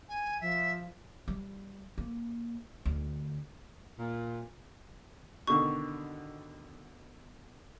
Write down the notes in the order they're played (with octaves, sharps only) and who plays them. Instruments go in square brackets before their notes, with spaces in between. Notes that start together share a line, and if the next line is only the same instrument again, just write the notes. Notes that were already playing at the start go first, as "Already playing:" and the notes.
[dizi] G#5
[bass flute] F3 [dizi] E5
[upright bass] G3
A#3
D2
[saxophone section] A#2
[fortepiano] B2 D3 D#3 [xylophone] C#6